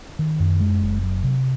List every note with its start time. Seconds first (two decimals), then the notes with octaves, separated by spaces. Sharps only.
0.19 D#3
0.40 F#2
0.60 G#3
0.82 F#1
1.03 F#3
1.24 C3